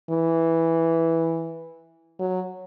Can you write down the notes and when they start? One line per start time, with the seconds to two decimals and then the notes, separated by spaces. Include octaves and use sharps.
0.10 E3
2.19 F#3